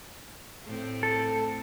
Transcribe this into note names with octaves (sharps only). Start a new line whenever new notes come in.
A2 C4
A4